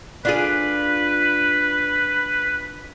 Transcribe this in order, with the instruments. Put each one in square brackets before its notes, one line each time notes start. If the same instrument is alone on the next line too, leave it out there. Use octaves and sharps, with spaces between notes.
[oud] D4 F4 G#4 [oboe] B4